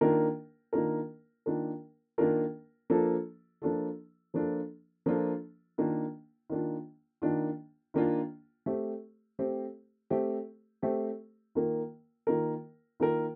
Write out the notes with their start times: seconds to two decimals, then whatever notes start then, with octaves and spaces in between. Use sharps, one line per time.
0.01 D#3 A#3 D4 F4 A#4
0.73 D#3 A#3 D4 F4 A#4
1.46 D#3 A#3 D4 F4 A#4
2.18 D#3 A#3 D4 F4 A#4
2.90 F3 A#3 D4 F4 A4
3.62 F3 A#3 D4 F4 A4
4.34 F3 A#3 D4 F4 A4
5.06 F3 A#3 D4 F4 A4
5.78 D#3 A#3 D4 F4
6.50 D#3 A#3 D4 F4
7.22 D#3 A#3 D4 F4
7.94 D#3 A#3 D4 F4
8.66 A3 C4 G4
9.39 A3 C4 G4
10.10 A3 C4 G4
10.82 A3 C4 G4
11.55 D#3 A#3 F4 A#4
12.27 D#3 A#3 F4 A#4
13.00 D#3 A#3 F4 A#4